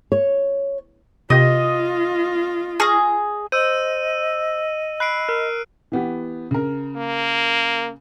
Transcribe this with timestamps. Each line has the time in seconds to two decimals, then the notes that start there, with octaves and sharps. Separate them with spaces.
0.12 C#5
1.30 C3 F4 G4 D#5
2.80 G#4 C#6 F6 A#6
3.52 C5 D#5 E6 D#7
5.00 B5 F#6 C7 D7
5.29 A#4
5.92 E3 B3 G4
6.51 C#3 A#4
6.96 A#3